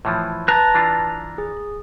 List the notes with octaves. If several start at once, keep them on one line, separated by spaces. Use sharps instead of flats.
A2 E3 F3
B4 A5 A#5 F#6 A6
E3 D4 F4
G#4